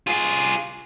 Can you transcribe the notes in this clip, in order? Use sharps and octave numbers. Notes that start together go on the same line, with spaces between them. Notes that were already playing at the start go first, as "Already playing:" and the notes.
F4 G#4